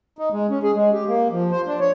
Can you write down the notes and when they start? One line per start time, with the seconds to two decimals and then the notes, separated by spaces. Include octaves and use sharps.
0.19 D#4
0.32 G#3
0.50 C#4
0.63 G#4
0.74 G#3
0.93 G4
1.08 A#3
1.32 F3
1.51 C5
1.67 D4
1.80 C#5